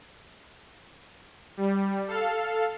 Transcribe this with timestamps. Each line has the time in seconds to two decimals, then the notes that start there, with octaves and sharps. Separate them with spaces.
1.57 G3
2.08 A4 F5